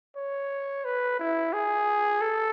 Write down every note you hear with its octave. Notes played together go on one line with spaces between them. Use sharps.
C#5
B4
E4
G#4
A4